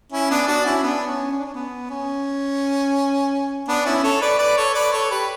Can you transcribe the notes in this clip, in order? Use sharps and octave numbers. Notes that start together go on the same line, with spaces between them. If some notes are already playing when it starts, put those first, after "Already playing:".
C#4 E4
B3 D4
D4 F#4
C#4 E4
B3 D4
C#4
C#4
D4
C#4
B3
C#4
B3 D4
C#4 E4
A4 C#5
B4 D5
B4 D5
A4 C#5
B4 D5
A4 C#5
G4 B4